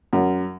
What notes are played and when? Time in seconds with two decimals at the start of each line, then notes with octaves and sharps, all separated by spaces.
0.13 F#2